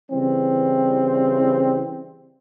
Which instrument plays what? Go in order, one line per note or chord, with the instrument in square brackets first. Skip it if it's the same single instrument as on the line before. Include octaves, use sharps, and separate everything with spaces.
[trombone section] C#3 E3 G3 C4